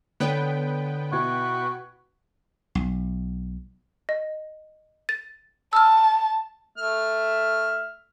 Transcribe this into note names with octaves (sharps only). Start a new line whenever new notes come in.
D3 B3 B4 C#5 G5
B2 E4 F#4 G#6
B1
D#5
A6
A5 E6 F6
A3 E5 F6